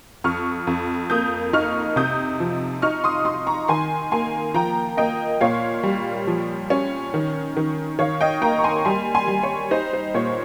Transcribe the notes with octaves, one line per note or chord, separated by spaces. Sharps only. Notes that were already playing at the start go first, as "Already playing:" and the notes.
F2 C#6 F6
F2
A#3 D#6 G6
D#4 C#6 F6
C3 D#6 G6
F3
D#4 C#6 F6
C6 D#6
D#4 C6 D#6
A#5 C#6
D#3 G#5 C6
A#3 G#5 C6
F3 G5 A#5
A#3 D#5 G5
A#2 C#5 F5
G3
F3
C#4
D#3
D#3
D#3 C#5 F5
D#5 G5
A#3 G5 A#5
C#6
G#5 C6
G3 G#5 C6
G#5 C6
G3
C#5
D#4 C5
C5
A#2 C#5